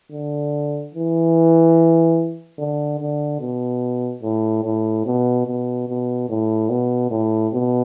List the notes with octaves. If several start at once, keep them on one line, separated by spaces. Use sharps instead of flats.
D3
E3
D3
D3
B2
A2
A2
B2
B2
B2
A2
B2
A2
B2